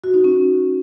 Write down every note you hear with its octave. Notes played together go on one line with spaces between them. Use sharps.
F#4
D#4
C#4